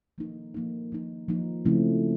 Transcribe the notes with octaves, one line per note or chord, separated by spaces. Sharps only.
F3 A#3 D#4
F3 A#3 D#4
F3 A#3 D#4
F3 A#3 D#4
C#3 F3 A3 C4 E4